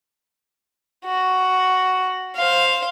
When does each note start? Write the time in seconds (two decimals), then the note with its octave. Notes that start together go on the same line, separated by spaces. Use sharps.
1.05 F#4
2.36 C5 F5